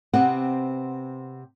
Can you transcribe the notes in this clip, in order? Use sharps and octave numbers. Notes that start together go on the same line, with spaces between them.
C3 B3 C4 G4 F#5